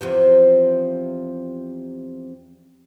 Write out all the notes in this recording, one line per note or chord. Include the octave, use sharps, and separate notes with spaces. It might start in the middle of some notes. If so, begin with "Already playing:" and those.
E2 C3 F3